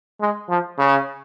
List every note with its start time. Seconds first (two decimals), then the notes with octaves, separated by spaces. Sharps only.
0.21 G#3
0.50 F3
0.79 C#3